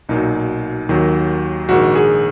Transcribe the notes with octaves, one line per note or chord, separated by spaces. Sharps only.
B1 A#2 F#3 D#4
D#2 D#3 F#3
A#1 G#2 D#3 F#4
G#4